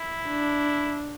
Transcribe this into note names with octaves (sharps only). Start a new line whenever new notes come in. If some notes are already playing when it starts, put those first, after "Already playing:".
Already playing: E4
D4